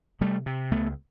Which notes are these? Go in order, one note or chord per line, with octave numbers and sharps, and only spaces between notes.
C3 G3 A3
C3
C#2 A3 B3